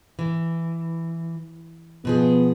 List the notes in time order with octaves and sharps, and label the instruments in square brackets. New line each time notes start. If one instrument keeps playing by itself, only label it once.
[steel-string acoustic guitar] E3
[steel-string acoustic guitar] B2 F3 G#4 [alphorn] B3